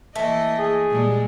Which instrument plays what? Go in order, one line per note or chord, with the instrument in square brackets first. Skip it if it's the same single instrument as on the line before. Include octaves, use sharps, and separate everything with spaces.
[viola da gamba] E3 A#3 D#5 [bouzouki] A3
[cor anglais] G#4
[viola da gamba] A#2 G3 G#3